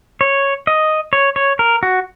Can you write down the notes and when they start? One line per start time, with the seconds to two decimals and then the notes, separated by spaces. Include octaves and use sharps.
0.21 C#5
0.67 D#5
1.13 C#5
1.36 C#5
1.59 A#4
1.83 F#4